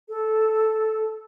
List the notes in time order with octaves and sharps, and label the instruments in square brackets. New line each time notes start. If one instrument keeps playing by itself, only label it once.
[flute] A4